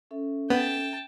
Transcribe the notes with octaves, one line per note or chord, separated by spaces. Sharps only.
C#4 A4 E5
B3 G5 A5